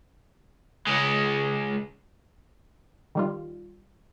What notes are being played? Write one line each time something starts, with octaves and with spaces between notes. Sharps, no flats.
C#2 G#3
D#3 G3 F4